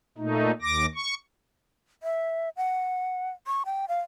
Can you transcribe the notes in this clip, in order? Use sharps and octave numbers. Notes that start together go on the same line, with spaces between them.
A#2 A3 D#4
D#2 D6 A#6
C#6
E5
F#5
C#6
G5
F5